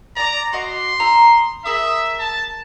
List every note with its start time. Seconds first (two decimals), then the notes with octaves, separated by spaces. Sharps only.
0.16 D5 A#5 D6
0.53 F#4 D#5 C6 D6
1.00 D#4 A#5 E6
1.65 G#4 A#4 E5 D#6
2.20 A5